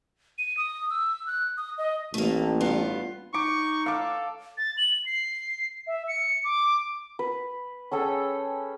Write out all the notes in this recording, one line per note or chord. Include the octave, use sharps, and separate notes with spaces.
D#7
D#6
E6
F#6
D#6
D#5
A1 A3 A#3
G2 B3 F4
D#4 C#6 D6
A4 F5 D6
A6
F#7
C7
E5
C#7
D6
B4
C#4 G#4 A4 G5